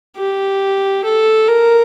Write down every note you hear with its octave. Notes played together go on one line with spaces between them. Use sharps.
G4
A4
A#4